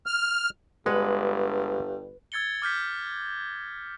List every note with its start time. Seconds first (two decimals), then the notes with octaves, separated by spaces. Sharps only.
0.06 F6
0.86 G1 G2 G#3 B4 F#5
2.32 E6 G#6 A6 C#7 G7
2.62 D6 F6 G6 B6